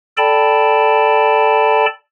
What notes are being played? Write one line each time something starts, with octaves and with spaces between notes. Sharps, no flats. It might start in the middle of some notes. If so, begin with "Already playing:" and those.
A4 D5 G5 A5 B5